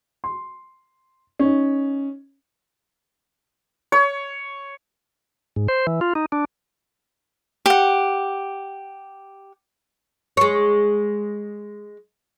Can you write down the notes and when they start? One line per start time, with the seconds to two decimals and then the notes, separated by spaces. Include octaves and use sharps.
0.24 C6
1.39 C#4 D#4
3.92 C#5
5.56 G#2
5.68 C5
5.87 E3
6.01 F4
6.15 D#4
6.32 D4
7.66 G4 F#5
10.37 G#3 C#5